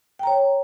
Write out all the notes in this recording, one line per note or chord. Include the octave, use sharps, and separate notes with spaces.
C#5 G5 A#5